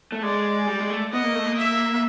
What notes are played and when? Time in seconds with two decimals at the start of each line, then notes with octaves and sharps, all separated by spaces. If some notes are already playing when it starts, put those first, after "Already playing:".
0.12 A3
0.23 G#3 D5
0.68 G3
0.79 G#3
0.90 A3
1.12 B3 D#5
1.24 A#3
1.35 A3
1.46 A#3
1.57 E5